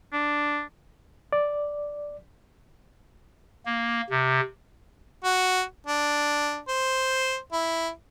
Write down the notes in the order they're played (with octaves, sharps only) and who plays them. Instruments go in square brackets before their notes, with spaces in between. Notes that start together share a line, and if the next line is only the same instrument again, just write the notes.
[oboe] D4
[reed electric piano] D5
[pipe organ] A#3
C3
[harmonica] F#4
D4
C5
E4